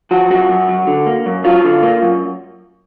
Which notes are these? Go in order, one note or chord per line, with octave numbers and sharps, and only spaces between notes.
F3 F#4
F#2 F#4
F#2
F#3
D3
A#3
F#2
F#3 F4
D3
A#3
F#2